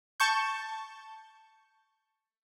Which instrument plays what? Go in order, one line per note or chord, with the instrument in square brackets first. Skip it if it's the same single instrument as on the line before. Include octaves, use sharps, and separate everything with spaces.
[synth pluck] A5 C#6 G6